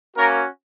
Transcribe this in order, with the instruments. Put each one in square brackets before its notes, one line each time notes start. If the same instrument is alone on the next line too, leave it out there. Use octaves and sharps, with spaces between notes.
[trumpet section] A#3 C#4 F#4 A#4